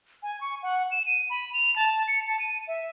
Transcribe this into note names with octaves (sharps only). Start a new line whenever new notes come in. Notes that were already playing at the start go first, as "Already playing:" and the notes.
G#5
C#6
F#5
E7
D#7
B5
F7
A5
C#7
A5
D#7
E5